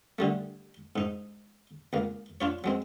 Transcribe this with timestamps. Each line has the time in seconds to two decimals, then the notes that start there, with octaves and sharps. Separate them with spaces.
0.19 D3 G3 A3
0.96 G#2 D#4
1.93 C#2 A#3
2.41 D4 F4 C#5
2.64 F#3 G#3 C4